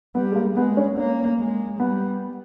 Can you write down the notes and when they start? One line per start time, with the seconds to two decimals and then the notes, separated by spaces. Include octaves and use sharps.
0.15 G3 B3
0.32 G#3
0.35 A#3
0.57 G#3 B3
0.77 C#4
0.97 A#3 C#4
1.38 G#3
1.79 G3 B3